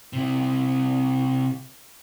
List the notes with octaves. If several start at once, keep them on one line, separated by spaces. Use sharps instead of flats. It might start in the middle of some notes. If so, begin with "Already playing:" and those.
C3 E4